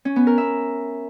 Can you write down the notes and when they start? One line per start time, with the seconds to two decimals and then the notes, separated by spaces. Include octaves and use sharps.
0.05 C#4
0.16 B3
0.27 A#4
0.38 E5